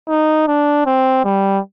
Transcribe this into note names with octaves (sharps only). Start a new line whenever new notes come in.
D#4
D4
C4
G3